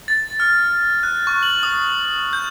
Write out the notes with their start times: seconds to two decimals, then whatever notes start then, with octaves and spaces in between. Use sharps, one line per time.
0.08 A6
0.40 F6
1.03 F#6
1.27 C#6
1.43 F#7
1.63 D#6
2.33 G6